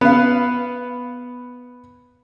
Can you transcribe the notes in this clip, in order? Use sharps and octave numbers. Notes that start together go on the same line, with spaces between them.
B3 F5